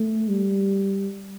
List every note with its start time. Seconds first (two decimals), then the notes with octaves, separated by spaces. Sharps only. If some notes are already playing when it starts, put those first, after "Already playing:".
Already playing: A3
0.29 G3